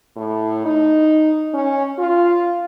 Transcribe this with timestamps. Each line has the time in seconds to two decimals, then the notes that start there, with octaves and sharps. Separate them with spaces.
0.16 A2
0.65 D#4
1.54 C#4
1.99 F4